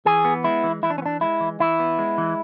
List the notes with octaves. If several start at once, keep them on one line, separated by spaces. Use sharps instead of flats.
E3 G#4
B3
G#3 E4
E3
E3 E4
D4
C#4
B3
D4
G#3 E4
E3
E3 E4
B3
G#3
E3